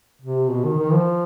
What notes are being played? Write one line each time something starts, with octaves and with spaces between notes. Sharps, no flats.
C3
B2
D#3
D#3
F3